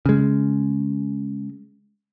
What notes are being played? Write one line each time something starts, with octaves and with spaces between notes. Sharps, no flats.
C#3 G#3